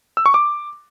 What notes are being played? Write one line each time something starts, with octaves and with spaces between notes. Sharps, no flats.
E6
C#6
D6